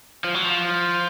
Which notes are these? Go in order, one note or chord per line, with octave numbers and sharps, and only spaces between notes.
F3
F#3
F3